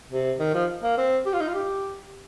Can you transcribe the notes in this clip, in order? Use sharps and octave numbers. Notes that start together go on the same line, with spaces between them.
C3
D#3
F3
A#3
C4
G4
F4
D#4
F4
G4